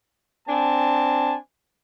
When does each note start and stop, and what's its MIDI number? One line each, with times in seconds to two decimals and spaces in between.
0.48 1.35 60
0.48 1.35 62
0.48 1.35 80
0.48 1.35 81